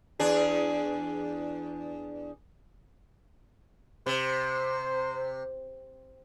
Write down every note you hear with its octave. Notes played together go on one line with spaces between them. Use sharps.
E2 D4 G#4
C3 C5